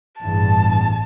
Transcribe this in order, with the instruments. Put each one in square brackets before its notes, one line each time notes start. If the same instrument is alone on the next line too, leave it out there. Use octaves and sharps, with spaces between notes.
[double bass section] A1 E2 G2 [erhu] A5